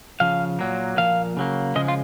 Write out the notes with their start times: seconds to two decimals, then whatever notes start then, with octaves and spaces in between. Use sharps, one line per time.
0.20 C#3 F3 F5
0.59 A#2 F#3 A#3
0.97 A#2 F3 A#3 F5
1.37 C#3 F#3 A#3
1.75 C#3 F3 G#3 D#5
1.88 F4